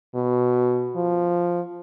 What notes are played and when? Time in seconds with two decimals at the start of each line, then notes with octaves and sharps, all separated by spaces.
0.15 B2
0.96 F3